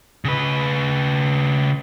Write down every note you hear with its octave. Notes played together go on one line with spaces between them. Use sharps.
C#3 B4